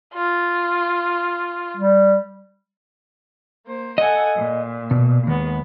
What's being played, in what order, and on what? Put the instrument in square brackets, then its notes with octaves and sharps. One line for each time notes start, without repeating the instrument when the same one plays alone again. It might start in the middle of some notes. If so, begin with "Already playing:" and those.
[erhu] F4
[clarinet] G3
[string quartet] A#3 C5
[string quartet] A4 F#5 G#5 [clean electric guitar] D#5
[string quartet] A#2
[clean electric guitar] B2
[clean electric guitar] D#2 [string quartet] G#3 B3